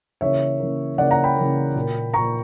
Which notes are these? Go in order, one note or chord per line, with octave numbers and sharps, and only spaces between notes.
C#3 E3 A#3 C#5 E5
C#3 E3 A#3
C#3 E3 A#3 D5 F#5
F#5 A#5
G5 B5
C#3 E3 A#3
A#2 A#3
A#2 A#3 A#5 C#6